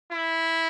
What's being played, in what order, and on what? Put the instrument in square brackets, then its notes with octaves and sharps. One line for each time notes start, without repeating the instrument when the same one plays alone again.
[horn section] E4